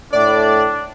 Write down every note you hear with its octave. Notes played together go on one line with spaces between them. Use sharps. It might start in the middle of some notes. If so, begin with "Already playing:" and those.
A2 D4 D5